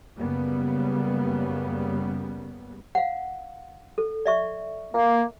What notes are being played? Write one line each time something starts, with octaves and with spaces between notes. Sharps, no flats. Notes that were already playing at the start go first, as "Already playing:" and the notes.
F#2 C#3 G3 A#3 B3
F5 F#5
A4
D5 E5 C#6
A#3